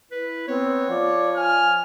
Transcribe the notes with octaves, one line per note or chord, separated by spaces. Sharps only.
E4 B4
B3 C4 C#5
F3 D5
G#5 F6